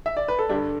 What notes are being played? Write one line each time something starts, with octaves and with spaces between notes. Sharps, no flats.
E5
D5
B4
A4
G2 D3 D4 G4